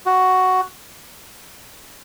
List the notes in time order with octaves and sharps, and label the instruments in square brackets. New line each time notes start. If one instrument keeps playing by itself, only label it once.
[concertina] F#4